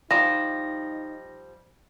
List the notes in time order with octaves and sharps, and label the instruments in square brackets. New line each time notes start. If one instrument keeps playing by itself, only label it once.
[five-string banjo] F3 G3 [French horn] D#4 [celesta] A#6